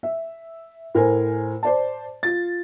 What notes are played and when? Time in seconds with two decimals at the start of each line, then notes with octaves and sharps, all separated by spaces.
0.03 E5
0.95 A2 A#4 C5 G#5
1.63 C5 D5 A5
2.23 F4 A6